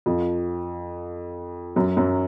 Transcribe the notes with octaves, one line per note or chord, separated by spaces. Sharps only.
F2 F3
F#2 F#3
F#2 F#3